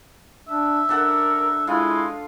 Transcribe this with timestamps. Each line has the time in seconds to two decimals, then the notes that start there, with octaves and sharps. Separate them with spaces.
0.48 D4 E5
0.89 D4 A4 A#4 F#5
1.67 G#3 E4 F4